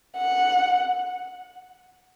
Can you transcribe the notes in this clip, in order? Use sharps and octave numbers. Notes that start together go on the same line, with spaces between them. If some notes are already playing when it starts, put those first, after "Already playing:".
F#5